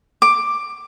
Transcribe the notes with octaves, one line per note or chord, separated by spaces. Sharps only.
D6